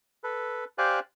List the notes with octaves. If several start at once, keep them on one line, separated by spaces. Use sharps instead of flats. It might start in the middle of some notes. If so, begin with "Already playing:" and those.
A4 B4
G4 C5 D5 F5 G#5 F#6